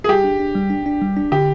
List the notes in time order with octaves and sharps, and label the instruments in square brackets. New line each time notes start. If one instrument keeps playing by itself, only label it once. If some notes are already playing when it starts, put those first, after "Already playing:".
[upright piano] G#4
[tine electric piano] G3 [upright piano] G4
[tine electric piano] D4
D4
G3
D4
D4
G3
D4
[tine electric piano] D3 [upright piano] G4